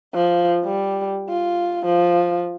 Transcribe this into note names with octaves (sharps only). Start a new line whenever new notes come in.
F3
G3
F4
F3